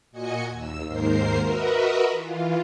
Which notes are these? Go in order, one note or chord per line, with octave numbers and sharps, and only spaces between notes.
A#2 F#4 D#5 G#5 C#7
D#2 E6
D#2 G#2 A#4 C5 C7
F#4 A#4 B4 D#5 E5
E3 F4